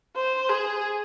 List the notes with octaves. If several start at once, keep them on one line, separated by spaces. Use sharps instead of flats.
C5
G#4